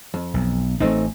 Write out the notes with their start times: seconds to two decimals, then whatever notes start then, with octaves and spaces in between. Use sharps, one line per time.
0.14 F2
0.34 B1
0.80 A1 A3 C4 D#4